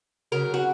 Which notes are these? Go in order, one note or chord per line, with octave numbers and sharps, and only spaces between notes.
C#3 F#3 A#4
F#4